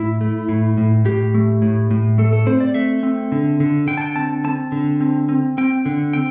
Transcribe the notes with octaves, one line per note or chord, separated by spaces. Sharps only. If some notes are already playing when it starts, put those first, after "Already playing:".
Already playing: A2 E4
A3
A2
A2
A2 G4
A3
A2
A2
A3 A4
A4
C4 C5
D5
A3 E5
C4
D3
D3
D3 G5
A5
G5
C4 A5
C4 A5
D3
C4
C4
C4 G5
D3
C4 G5